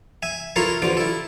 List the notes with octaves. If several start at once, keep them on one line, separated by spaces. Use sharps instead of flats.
E5 G#5
E4 F4 A4 A#4 C#5 F5
A1 D3 F3 F4 D6
E4 A4